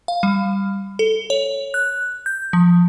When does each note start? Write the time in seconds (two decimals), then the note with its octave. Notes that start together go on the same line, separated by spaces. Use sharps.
0.08 F5
0.23 G3
0.99 A4
1.30 C#5
1.74 F#6
2.26 G6
2.53 F3